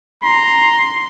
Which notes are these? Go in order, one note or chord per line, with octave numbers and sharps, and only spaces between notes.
A#5 C6